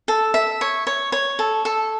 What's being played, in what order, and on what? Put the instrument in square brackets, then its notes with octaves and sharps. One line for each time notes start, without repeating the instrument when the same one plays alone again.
[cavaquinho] A4
E5
C#5
C#5
C#5
A4
A4